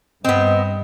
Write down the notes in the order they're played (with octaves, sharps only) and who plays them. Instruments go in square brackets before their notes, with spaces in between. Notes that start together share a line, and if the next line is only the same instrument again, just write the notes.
[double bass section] G2 [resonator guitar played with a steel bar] B3 C4 [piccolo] D#5